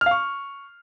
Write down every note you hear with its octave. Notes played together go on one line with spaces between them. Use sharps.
F6
F5
C#6